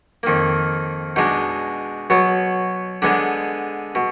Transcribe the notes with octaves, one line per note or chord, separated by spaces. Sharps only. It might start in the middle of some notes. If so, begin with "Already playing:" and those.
F2 D#3 A#3
B2 G#3 D4 D#4
B2 F#3 B3
D3 G#3 B3 D4
B2